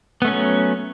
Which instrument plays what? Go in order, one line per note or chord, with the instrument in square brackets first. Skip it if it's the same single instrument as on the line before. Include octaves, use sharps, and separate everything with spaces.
[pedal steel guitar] B3
A3
C#4
F#3